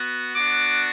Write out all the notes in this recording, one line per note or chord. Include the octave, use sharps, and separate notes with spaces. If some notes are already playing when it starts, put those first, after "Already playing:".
Already playing: B3 F#4
B3 D4 F#4 D6